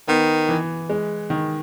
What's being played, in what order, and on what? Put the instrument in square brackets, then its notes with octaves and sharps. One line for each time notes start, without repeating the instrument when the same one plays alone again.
[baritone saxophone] D#3 [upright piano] B3
[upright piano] E3
G#3
D#3